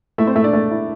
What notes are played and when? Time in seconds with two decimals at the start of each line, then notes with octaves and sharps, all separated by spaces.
0.18 A3 E4 E5
0.27 C4 C5
0.35 A3 E4 E5
0.44 D4 D5
0.53 A3
0.71 E4